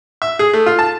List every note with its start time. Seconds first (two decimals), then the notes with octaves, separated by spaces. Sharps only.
0.22 E5
0.39 G#4
0.54 A3
0.66 F4
0.79 A5